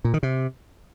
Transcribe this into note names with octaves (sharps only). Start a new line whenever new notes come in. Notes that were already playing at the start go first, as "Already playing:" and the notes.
A#2
D#3
C3